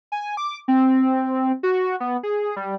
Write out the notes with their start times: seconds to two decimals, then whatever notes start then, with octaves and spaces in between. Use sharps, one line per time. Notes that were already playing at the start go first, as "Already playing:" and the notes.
0.12 G#5
0.37 D6
0.68 C4
1.63 F#4
2.00 B3
2.23 G#4
2.56 G3